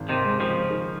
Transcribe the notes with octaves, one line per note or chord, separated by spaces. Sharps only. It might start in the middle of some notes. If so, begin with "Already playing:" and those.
Already playing: G#1
C3 D#3
G#3
C#3 F3
D#3